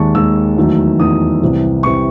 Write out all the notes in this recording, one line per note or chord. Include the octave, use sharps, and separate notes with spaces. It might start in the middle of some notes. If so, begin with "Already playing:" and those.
Already playing: D#2 D#3 G#3 A5 C#6
D#2 D#3 G#3 E6
E2 D#3 F#3 A3
E2 D#3 F#3 A3 D#6
C2 C3 E3
C3 E3 C#6